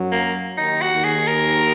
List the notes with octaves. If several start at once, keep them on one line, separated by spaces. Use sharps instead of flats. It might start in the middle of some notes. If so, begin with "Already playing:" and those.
Already playing: F#2 F#3
A#3
D#2 D#3 D#4
F#4
D#2 D#3
G#4
A#4